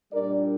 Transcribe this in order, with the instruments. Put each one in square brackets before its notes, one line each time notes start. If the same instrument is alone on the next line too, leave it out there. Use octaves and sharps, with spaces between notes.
[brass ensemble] A#2 G3 D4 A#4 D5